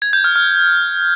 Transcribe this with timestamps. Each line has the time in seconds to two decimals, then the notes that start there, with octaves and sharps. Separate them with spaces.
0.02 G#6
0.13 G6
0.24 F6
0.36 F6